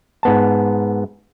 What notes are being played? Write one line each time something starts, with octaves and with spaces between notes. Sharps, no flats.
G#2 B3 A5